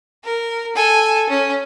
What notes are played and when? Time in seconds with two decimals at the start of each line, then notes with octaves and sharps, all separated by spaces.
0.24 A#4
0.75 A4 G#5
1.29 C#4